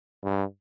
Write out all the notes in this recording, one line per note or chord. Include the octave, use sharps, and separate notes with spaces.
G2